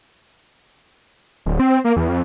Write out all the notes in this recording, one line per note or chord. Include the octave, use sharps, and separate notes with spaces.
D1
C4
A#3
E2
F2